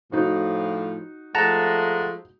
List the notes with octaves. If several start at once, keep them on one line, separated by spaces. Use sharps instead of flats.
A2 F3 D#4 F#4
F3 G#3 A3 F#5 A5 A#5